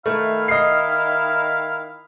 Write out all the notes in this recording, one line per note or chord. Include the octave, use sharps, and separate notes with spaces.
D#3 A3 E4 F5
D#5 C7